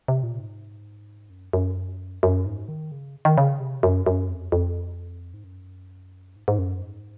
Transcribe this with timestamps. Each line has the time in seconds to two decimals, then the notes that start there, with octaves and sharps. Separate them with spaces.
0.08 C3
0.23 A#2
0.39 G#2
1.30 F#2
1.53 F#2
2.23 F#2
2.46 G#2
2.69 D#3
2.92 C#3
3.25 D#3
3.38 C#3
3.60 C3
3.83 F#2
4.06 F#2
4.29 F2
4.52 F2
5.34 G#2
5.44 F#2
6.36 G#2
6.48 G#2
6.59 F#2
6.82 G#2